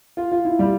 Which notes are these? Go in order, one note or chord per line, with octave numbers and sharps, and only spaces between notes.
F4
F4
E4
G3